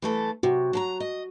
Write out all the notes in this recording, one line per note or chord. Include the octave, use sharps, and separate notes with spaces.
E3 A3 A4
C3 F#4
F#3 A5 A#5
D#5